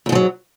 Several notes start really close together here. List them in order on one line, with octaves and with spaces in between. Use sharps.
F2 G#2 F3 F#3